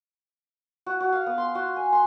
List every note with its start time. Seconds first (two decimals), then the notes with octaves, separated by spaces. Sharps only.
0.86 F#4
1.00 F#4
1.12 F5
1.26 B3
1.38 C6
1.55 F#4
1.76 G#5
1.93 C6